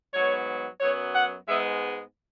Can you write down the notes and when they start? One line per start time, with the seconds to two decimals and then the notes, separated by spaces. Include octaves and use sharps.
0.14 G#2 F#3 B3 C#5
0.81 F#2 F#3 B3 C#5
1.15 F#5
1.48 G#2 G#3 B3 E5